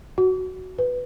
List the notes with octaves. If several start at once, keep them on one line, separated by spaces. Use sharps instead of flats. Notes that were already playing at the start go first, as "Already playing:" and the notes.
F#4
B4